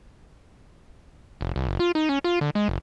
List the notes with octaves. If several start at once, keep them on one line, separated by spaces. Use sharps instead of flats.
F1
C2
F#1
F4
D#4
C#4
F4
D3
G#3
F#1